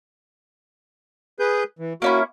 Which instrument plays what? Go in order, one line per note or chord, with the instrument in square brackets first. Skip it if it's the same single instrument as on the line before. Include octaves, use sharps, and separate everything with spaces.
[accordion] G#4 B4 G6
E3
[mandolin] A#3 C#4 E4 [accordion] F#4